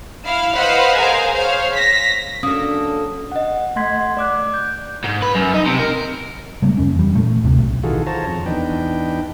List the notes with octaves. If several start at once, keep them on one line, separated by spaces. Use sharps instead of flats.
E4 F5
B4 C5 D#5 F5 F#5 B5
G#4 A#4 C5 F5 G#5
C5 C#5 F5
A#6 B6
F#3 A#3 C#4 D4 A4 D#6
D#5 F#5
A3 F#5 C6 G#6 B6
D5 D6 F#6
G6
G#2
B4
F#2
D#4
C3
A#4
C#3 G3 G#3 A#3
F2 C#4
E3 G3
A#2 A3
D2 A2 C3
B1
D#3 E3 F4 F#4 G#4 A4
F4 C5 C#5 A5 A#5
F2
E2 D4 D#4 B4 G5